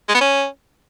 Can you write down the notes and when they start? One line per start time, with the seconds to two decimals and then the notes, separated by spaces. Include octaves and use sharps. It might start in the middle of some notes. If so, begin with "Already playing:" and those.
0.09 G#3
0.15 B3
0.21 C#4